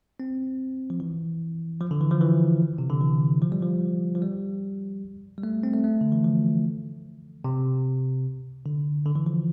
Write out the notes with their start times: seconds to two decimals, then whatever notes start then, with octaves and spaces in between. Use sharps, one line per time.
0.20 C4
0.90 F3
1.00 E3
1.81 F3
1.91 D3
2.01 E3
2.11 F3
2.21 E3
2.78 C3
2.90 D3
3.01 E3
3.41 F3
3.52 G3
3.62 F3
4.15 F3
4.22 G3
5.38 G3
5.43 A3
5.63 C4
5.74 A3
5.84 A3
6.01 D3
6.12 E3
6.24 F3
7.44 C3
8.66 D3
9.06 D3
9.16 E3
9.26 F3